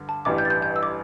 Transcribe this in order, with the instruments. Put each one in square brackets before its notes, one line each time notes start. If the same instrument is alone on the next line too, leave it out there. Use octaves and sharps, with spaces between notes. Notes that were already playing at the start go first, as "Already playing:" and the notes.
Already playing: [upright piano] G2 D3
[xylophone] A5
[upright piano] A1 G2 E3 G3 [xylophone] D6
[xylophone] G6
A6
G6
G6
E6
D6